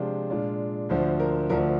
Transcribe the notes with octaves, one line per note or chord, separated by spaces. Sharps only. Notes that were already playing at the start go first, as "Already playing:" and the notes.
Already playing: C3 F3 G#3 D4 F4 C5
A#2 G#3 D4 F4
D2 D3 F3 C5
A#4
D2 D3 F3 A#4